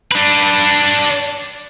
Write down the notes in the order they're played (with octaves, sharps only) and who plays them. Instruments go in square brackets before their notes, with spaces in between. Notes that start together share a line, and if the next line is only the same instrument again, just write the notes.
[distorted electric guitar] D4 B4